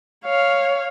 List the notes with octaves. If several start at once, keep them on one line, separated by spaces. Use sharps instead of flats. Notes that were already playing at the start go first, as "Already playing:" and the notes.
C#5 F5